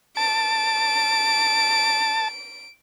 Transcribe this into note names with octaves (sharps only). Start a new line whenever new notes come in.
A5 D7